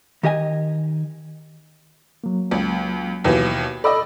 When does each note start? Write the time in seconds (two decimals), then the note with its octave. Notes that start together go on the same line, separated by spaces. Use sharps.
0.23 D#3 G4 D#5 G#5
2.24 F#3 A#3
2.51 C#2
3.24 D#2 B2 E3
3.84 A4 D5 D#5 B5 E6